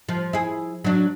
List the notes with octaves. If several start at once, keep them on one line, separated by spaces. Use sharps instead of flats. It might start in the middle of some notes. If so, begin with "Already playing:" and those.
F3
E4 G#4
F#3 D4